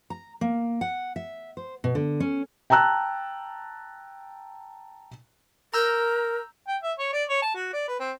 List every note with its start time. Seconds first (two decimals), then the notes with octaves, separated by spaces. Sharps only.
0.10 A#5
0.41 A#3
0.81 F#5
1.16 E5
1.57 C5
1.84 B2
1.95 D3
2.20 C#4
2.70 G5 A5 A#5 E6 F#6
5.74 A#4 A#5 E6 G6
6.68 G5
6.83 E5
6.99 C#5
7.13 D5
7.29 C#5
7.42 A5
7.55 F#4
7.73 D5
7.88 B4
8.00 C4